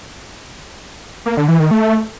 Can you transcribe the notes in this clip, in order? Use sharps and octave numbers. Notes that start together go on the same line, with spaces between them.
A#3
D3
E3
D#3
A3